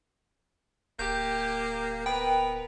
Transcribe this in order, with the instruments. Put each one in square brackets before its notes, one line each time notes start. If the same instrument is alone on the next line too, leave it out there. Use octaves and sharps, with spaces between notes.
[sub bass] D1 [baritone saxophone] A#3 [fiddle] G4 [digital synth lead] G6
[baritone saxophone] B3 [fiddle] A#4 B4 [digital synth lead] G5